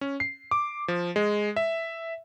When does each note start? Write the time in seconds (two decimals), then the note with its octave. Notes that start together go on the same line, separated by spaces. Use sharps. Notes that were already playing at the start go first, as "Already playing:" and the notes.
0.01 C#4
0.20 C7
0.51 D6
0.88 F3
1.16 G#3
1.56 E5